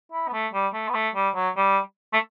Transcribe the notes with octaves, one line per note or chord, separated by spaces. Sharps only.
E4
B3
A3
G3
A3
B3
A3
G3
F#3
G3
A3